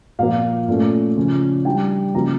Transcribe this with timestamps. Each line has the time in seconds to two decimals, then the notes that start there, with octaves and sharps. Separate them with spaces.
0.19 A#2 F3 A#3 F5
0.68 A#2 A3 C#4
1.17 C#3 F3 C#4
1.65 E3 G3 D4 G5
2.14 C#3 F3 A#3 C#4 A#5